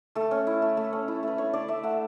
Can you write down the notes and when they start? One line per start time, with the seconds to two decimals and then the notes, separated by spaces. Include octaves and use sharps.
0.15 A3 A4
0.31 C#4
0.47 E4
0.62 A3
0.77 A3
0.93 C#4
1.08 E4
1.23 A3 B4
1.38 D4 C#5
1.53 D4 D5
1.68 A3 E5
1.83 A3 F#5